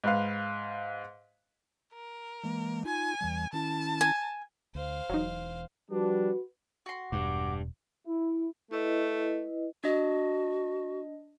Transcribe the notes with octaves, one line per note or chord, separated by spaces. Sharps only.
G#2 B4 F5
A#4
E3 G#3 A#3
D#4 F4 G#5
E2 E3 G3
D#3 C#4 E4 A5
G#5
D2 C5 F5
E1 E2 F#3 D#4
F3 G3 D4 F#4 B4
F#4 C6
E1 G2 D6
E4
A3 E4 B4 D#5
D4 F#4 D#5